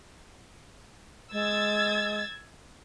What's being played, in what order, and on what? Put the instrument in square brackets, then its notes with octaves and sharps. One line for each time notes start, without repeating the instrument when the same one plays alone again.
[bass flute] G#3 [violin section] E6 G#6 A6